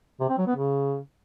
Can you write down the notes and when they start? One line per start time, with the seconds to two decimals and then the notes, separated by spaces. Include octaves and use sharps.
0.20 C3
0.29 C4
0.38 F#3
0.47 B3
0.56 C#3